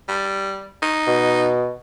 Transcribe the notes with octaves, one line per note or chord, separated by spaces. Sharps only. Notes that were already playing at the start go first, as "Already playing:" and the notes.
G3
D#4
B2